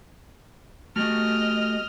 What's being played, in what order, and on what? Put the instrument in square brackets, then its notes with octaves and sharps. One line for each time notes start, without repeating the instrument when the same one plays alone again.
[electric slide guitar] A3 F#4 G4 [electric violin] D#5 F6